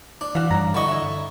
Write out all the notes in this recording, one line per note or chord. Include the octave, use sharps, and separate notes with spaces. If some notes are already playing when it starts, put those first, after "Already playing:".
D4
E3 F#4 F5
G2 C#3 A#5
D3 E4 F#4 D#5 C#6
E4 E5